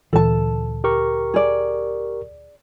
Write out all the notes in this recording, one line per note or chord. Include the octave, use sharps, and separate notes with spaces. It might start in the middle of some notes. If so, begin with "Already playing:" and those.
D2 A#2 E3 A4 A5
G4 A#4 C#6
G#4 D5